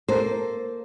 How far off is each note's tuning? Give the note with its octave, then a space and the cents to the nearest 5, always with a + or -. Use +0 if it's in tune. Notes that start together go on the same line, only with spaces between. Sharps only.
A#3 +0 A4 +0 C5 +0